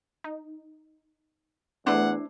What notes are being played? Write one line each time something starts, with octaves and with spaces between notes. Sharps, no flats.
D#4
E2 A3 D4 E4 B4 C5 F#5